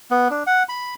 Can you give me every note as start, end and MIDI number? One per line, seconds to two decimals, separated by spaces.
0.11 0.28 59
0.30 0.43 62
0.47 0.63 78
0.69 0.95 83